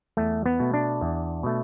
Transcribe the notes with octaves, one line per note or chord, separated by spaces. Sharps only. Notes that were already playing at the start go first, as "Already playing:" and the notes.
E2 A3
B3
B2 A3
D4
E2
B2 A3